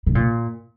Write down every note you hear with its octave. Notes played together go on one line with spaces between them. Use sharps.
C3
A#2